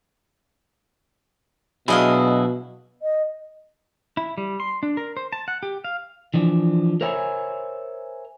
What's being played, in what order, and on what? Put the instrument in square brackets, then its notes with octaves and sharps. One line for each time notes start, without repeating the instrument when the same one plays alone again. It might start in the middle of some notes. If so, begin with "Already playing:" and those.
[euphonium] B2 [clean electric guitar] F#3 D4 E4 [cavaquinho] G#4 D#5 F5
[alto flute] D#5
[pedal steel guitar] E4
G3
C6
D4
A#4
C5
A5
F#5
G4
F5
[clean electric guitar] E3 F3 D4
A#4 C5 C#5 E5 G#5 B5